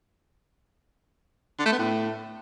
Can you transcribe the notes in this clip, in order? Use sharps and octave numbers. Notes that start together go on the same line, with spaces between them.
D3
A3
B3
A2